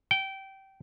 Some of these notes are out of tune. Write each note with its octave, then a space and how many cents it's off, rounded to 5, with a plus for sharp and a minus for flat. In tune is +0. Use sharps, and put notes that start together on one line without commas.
G5 -20